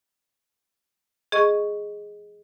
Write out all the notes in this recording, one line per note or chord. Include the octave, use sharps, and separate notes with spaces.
G#4 D#5 C#6